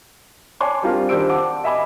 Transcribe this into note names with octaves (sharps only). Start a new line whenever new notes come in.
C#5 D5 G#5 A5 C6 D6
G3 C4 D4 F4 G4 A#4
D#3 D4 G4 C5 E6 D7
F#5 A5 D6
D#5 E5 G#5 B5 D6